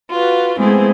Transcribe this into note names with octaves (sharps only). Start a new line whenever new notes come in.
F4 F#4 B4
G#3 A3 B3 C4 E4 G#4